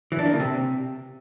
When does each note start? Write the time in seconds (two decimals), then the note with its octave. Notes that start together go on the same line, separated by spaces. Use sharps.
0.12 E3
0.19 D4
0.26 A#3
0.33 C#3
0.40 C3